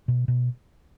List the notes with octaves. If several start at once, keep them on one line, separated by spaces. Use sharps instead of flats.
B2
B2